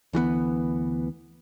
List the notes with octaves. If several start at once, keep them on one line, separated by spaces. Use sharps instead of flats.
D2 E3 F#3 B3